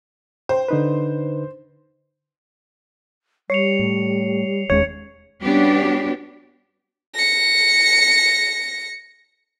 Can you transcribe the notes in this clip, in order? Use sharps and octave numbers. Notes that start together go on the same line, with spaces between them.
C5 G5
D3 D#4 B4
G3 C#5 C7 C#7 F7
A2
E1 D#2 G#3 C#4 C#5 G#6 C#7 F7
G3 B3 C#4 D4 F#4 G4
A#6 C#7